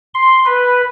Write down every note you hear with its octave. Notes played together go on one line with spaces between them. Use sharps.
C6
B4